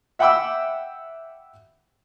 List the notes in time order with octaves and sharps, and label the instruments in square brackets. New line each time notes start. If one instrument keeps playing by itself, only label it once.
[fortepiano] E5 F#5 G5 B5 D6 E6